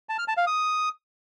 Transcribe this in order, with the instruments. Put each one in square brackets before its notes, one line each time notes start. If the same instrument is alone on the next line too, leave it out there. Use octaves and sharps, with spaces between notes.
[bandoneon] A5
F6
A5
F5
D#6